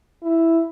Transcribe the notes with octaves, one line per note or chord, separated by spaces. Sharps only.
E4